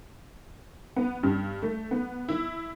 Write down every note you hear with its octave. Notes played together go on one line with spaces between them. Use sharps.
B3
G2
A3
B3
E4